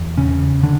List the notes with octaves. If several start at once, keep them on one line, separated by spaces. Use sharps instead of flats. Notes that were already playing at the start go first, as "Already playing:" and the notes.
Already playing: E2
E1 C#3 C#4
D3 D4